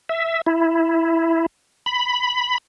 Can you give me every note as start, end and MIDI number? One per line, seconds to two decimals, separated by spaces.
0.09 0.41 76
0.46 1.46 64
1.86 2.58 83